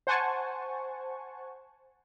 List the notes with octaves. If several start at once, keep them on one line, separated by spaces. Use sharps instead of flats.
C5 F#5 G#5 A5 C#6